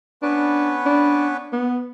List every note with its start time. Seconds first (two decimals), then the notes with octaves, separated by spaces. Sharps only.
0.23 B3 C#4 D4 B4
0.86 D4
1.53 B3